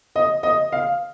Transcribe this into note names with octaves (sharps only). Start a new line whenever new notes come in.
D#5
D#5
F5